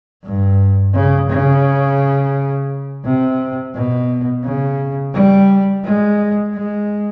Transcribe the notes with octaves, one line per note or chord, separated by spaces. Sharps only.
G2
C#3
C#3
C3
B2
C#3
G3
G#3
G#3